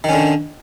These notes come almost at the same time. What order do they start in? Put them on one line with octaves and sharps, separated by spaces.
D#3 C#4 D3